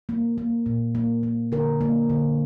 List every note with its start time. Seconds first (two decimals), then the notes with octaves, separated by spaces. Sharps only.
0.09 A#3
0.38 A#3
0.66 A#2
0.95 A#3
1.23 A#3
1.52 D3 A#4
1.81 A#3
2.10 D3